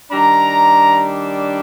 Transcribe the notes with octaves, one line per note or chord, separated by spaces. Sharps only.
D#3 G3 D4 A#5